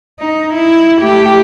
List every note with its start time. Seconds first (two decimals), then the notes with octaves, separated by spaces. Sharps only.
0.20 D#4
0.54 E4
1.00 A3 G4